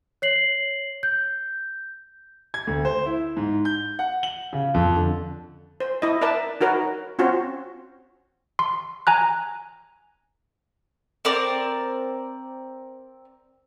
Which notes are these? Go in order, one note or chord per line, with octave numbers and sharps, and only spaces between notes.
C#5 C7 F#7
G6
G#6
D2
C5
E4
G#2
G6
F#5
F#7
C#3
F2
D3
C5
E4 D#5
A#4 B4 D5 E5 A5
D#4 F#4 A#4 B4 C#5
C4 C#4 F4 F#4
C6
G#5 A#5 F#6
C4 A#4 D5